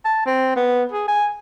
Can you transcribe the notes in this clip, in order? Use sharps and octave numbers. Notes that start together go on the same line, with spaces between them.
A5
C4
B3
G#4
G#5